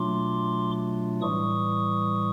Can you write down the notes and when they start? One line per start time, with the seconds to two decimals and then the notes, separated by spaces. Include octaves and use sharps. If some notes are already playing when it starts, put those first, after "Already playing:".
Already playing: B2 F#3 A3 D4 F4 C6 D6
1.21 A2 E3 G3 C#6 D#6